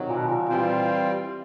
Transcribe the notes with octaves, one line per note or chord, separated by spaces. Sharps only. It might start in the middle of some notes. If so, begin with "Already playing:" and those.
Already playing: C3 D#3 F#3
A#2
B2
A#2
E3 G3 C4 F4